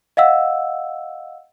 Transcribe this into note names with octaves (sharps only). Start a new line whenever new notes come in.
D#5 F5 F#5 E6